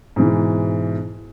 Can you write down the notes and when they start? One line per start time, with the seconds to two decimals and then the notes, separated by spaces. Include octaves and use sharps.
0.16 G#2 B2 E3